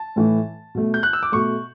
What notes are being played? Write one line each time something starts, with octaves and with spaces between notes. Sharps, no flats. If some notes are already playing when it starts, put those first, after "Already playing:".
Already playing: A5
A2 E3 A3
B2 A3
G6
F#6
E6
D6
B2 A3 C#6